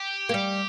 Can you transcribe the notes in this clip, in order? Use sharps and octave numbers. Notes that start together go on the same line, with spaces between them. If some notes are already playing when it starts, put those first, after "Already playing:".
Already playing: G4
A#3
G3